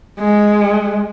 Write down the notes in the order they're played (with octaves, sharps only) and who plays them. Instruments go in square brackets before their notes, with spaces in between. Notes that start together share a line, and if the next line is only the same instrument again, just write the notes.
[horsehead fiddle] G#3